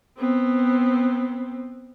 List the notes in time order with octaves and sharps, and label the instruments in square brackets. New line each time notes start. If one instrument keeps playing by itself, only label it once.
[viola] B3 C4